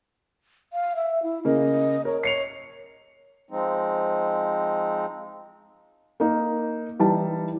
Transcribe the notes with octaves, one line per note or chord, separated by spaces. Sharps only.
F5
E5
E4
C#3 A#3 D#5
A#4 C#5
C#5 C7 C#7 F7
F3 G#3 C4 D#4
A#3 D#4 A#4
E3 G3 D#4 A5